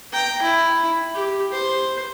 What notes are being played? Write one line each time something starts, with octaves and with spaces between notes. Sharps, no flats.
G5 A#5
E4
G4
C5